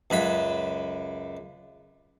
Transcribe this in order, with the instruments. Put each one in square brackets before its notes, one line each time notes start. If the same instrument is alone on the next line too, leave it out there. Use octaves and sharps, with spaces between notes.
[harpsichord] C#2 F#2 B5